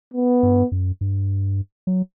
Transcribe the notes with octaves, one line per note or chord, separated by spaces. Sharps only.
B3
G2
F#2
G2
F#3